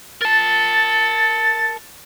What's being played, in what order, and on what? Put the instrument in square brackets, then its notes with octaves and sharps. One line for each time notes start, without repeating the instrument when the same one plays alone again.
[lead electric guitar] A#4 A5 [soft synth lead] A6